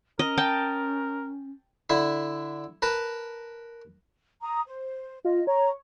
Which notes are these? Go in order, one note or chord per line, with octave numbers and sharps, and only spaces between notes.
C#4 A#4 D#5
G5 A5
D3 E4 E5
A#4 B4 A5
A#5 D#6
C5
F4 D#5
C#5 A#5